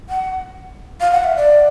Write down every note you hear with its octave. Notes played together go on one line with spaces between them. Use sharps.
F#5
F5
F#5
E5
D5